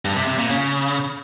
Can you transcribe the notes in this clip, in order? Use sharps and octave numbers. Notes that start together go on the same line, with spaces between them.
G2
C3
C3
A#2
C#3